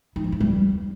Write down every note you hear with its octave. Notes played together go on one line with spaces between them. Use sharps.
D#4
F3
F#3
G3